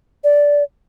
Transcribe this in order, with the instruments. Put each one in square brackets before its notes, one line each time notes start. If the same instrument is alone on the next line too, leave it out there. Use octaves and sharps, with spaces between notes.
[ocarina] D5